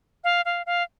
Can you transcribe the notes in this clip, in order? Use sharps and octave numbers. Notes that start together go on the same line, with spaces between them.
F5
F5
F5